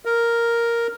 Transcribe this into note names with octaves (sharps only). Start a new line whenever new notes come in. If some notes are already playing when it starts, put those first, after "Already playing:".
A#4